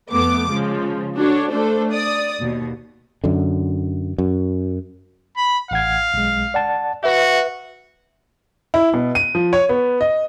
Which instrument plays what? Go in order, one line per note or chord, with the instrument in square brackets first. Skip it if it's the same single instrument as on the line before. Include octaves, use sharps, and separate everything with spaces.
[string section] F2 A3 B3 D6
C#3 F3 G#3
D4 F#4 A4 C#5
A3 D4 A4 C5
D5 D#6
D#2 B2
[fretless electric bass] F#2 D3
F#2
[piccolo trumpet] B5
[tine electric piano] A1 F#5 G#6 [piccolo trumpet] F5
[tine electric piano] B1 G#3
D5 F#5 A5
[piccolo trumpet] F#4 [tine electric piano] B4 E5
[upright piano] E4
B2
D#7
F3
C#5
B3
D#5